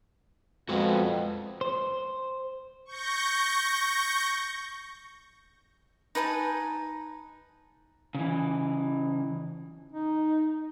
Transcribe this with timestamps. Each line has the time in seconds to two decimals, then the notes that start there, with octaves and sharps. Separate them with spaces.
0.69 F2 G#3 B3 F#4
1.61 C5
2.85 C#6 G6 A#6
6.15 D#4 B4 G#5 A5
8.15 C#3 E3
9.92 D#4